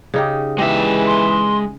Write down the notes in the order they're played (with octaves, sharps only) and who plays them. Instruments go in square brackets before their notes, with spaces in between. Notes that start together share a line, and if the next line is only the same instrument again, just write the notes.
[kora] C#3 D#4 G4
[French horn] E3 [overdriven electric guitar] G#3 E5 [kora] G4
[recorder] C6